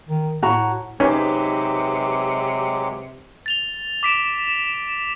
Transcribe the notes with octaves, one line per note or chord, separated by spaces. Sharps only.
D#3
A2 F#4 A#5
C3 F#3 G#3 C#4 D#4 G4 B4 C5
A6 F7 G7
D6 B6 D7 E7